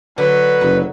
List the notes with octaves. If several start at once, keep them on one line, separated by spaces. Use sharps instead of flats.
D3 F#3 B4
F#1 D#4